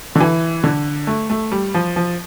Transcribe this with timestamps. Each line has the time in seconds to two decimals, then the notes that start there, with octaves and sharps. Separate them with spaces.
0.15 D3
0.20 E3
0.64 D3
1.07 A3
1.30 A3
1.52 G3
1.74 F3
1.96 F3